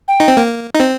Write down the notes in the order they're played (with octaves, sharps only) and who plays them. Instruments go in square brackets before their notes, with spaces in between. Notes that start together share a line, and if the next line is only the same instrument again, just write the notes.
[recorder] G5
[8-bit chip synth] D#4
C4
A#3
D#4
C4